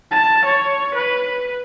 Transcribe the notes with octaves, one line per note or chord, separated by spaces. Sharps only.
A5
C#5
B4